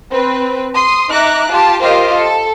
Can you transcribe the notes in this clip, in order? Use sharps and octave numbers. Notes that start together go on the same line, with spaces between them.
C4 B4
C6 D#6
D#4 E5 A#5 D6 F#6
F4 G4 A5
F4 G4 A#4 C5 D#5 F5
A4